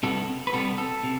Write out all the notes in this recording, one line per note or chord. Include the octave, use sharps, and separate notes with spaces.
C3 G3 B3 A4
B4
C3 G3 B3 A4
A4
C3